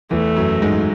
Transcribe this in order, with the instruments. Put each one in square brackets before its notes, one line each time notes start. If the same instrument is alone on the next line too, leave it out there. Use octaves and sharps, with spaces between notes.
[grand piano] E2 E3 [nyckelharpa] A3
[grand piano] F#2 F#3
G#2 G#3